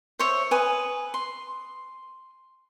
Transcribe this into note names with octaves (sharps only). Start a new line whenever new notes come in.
C5 C#5 E5
B4 G#5 D#6
C6